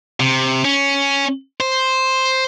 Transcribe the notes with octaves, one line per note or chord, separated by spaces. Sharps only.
C3
C#4
C5